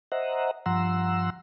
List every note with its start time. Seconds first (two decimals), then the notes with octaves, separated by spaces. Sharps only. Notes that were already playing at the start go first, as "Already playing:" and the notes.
0.12 C5 D#5 E5 F#5 A#5
0.66 G2 F3 F#5 A#5 C6 E6